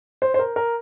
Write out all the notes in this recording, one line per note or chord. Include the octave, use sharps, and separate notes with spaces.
C5
C5
A#4
A#4